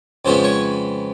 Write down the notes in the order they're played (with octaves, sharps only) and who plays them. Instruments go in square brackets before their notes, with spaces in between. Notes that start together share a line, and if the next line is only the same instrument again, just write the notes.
[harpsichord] F2 C#3 F3 G#3 B3 C5
C#5